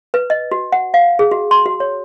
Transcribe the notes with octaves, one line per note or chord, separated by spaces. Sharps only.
B4
D#5
F#4
F#5
F5
G#4
F#4
C6
F#4
C#5